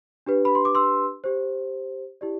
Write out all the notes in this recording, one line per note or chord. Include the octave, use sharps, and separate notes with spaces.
D4 G4 B4
B5
C6
D6
C6 E6
G4 C5
E4 G4 D5